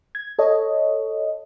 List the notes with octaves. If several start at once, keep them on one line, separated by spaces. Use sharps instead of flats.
G#6
A4 C#5 D#5